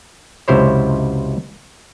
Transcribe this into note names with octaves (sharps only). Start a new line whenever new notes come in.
C#2 F#2 C3 E4 C5 C#5